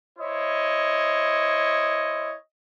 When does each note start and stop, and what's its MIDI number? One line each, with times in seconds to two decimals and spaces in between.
0.19 2.32 64
0.19 2.32 72
0.19 2.32 73
0.19 2.32 75